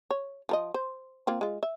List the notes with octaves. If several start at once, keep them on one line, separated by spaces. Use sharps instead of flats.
C#5
F3 A#4 D#5
C5
A#3 C4 F4
G#3 F4
E5